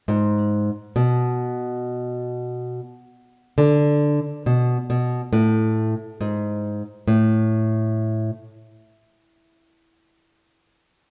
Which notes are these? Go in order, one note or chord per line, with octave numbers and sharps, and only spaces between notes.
G#2
B2
D3
B2
B2
A2
G#2
A2